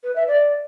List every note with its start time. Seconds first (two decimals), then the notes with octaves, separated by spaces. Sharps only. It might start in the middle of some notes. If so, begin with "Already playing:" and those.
0.04 B4
0.15 E5
0.27 D5